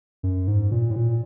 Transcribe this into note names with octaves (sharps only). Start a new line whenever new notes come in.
F#2
G#2
A#2
A2
A#2